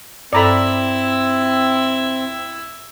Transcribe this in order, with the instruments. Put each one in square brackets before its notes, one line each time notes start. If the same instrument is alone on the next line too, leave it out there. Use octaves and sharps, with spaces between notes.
[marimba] G2 A4 [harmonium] C4 [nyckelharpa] E4 E5 [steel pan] D5 A#5 B5